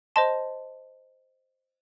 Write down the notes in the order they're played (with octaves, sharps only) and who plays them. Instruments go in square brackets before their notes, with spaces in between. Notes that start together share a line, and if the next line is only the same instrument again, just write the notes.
[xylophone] C5 D#5 A5 C6